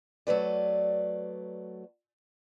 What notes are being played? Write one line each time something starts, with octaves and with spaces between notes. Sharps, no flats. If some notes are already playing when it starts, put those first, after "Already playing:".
F#3 A3 B4 D5